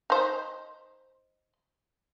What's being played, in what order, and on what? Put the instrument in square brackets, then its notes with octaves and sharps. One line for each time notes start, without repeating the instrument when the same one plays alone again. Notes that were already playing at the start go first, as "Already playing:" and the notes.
[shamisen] D#4 C5